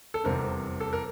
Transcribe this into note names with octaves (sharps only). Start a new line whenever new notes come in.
A4
F1 E2 C3 G3 C4 A#4
A4
A#4